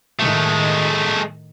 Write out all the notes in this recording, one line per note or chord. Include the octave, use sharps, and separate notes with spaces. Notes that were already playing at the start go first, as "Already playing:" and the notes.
A2 D#3 G#3 A3